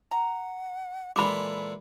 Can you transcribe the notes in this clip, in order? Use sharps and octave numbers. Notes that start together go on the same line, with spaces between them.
F#5 A#5
A#2 E3 G#3 A4 B5 D6